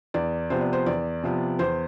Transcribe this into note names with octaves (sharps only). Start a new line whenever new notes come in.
E2 D5
C3 F3 B3 C5
D5
C5
E2 D5
C3 F3 B3
E2 C5